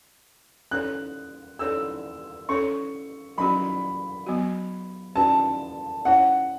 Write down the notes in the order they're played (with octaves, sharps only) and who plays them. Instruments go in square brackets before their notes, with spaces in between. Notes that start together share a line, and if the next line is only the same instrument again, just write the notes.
[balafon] C#4 A4 C#5 [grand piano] F#6
[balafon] C#4 A4 C#5 [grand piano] E6
[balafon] C#4 A4 C#5 [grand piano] C#6
[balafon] F#3 C#4 F#4 [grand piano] B5
[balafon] F#3 B3 F#4
[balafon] C#4 F#4 B4 [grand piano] A5
[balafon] C#4 E4 C#5 [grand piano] F#5